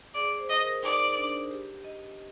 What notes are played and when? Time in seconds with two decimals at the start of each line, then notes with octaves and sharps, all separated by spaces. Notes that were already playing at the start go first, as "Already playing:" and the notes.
0.14 G#4 D5
0.38 C5
0.49 D#5
0.60 A#4
0.83 D#4 D5
1.17 D4
1.51 G4
1.84 D#5